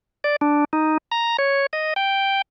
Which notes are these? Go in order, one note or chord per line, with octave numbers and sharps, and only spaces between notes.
D5
D4
D#4
A#5
C#5
D#5
G5